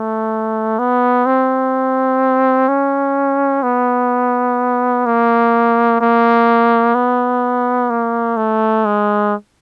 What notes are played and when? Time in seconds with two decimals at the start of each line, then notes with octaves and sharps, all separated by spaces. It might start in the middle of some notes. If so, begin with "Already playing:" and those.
Already playing: A3
0.79 B3
1.26 C4
2.68 C#4
3.63 B3
5.06 A#3
6.01 A#3
6.95 B3
7.90 A#3
8.37 A3
8.85 G#3